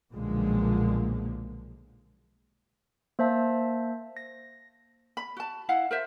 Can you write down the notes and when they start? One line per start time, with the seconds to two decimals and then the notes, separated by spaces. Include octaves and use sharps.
0.13 B1 A#2 D3 F3 G#3 A#3
3.19 A#3 C5 E5 A5
4.17 A#6
5.17 B5
5.37 F#4 A5
5.69 E4 F5 F#5
5.91 A#4 C5 E5